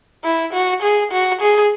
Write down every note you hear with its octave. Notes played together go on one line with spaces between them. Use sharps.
E4
F#4
G#4
F#4
G#4